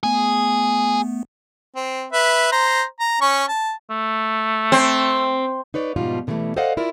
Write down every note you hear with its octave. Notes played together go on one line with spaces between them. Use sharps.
A3 B3 G#4
C4
B4 E5
C5 A#5
A#5
C#4 C#6
A5
A3
C4
D#4 B4 C#5 D5
G#2 B2 F3 G3 D#4 F4
B2 D3 E3 G3 A3
A4 C5 D5 D#5 F5 F#5
E4 F4 A#4 D5